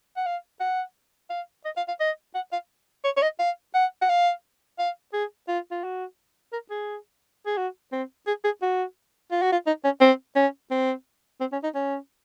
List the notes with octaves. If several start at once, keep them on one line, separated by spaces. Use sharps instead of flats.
F#5
F5
F#5
F5
D#5
F5
F5
D#5
F#5
F5
C#5
C#5
D#5
F5
F#5
F#5
F5
F5
G#4
F4
F4
F#4
A#4
G#4
G#4
F#4
C4
G#4
G#4
F#4
F4
F#4
F4
D#4
C#4
C4
C#4
C4
C4
C#4
D#4
C#4